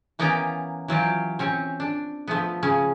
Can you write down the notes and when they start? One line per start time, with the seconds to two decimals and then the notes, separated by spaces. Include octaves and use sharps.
0.19 E3 A#3 B3 C#4 G5 A#5
0.88 E3 F#3 F4 G4
1.39 C4 C#4 C#5
1.80 D4
2.28 F3 A3 B3
2.63 C#3 C#4